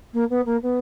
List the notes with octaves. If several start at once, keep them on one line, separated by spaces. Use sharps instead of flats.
A#3
B3
A#3
B3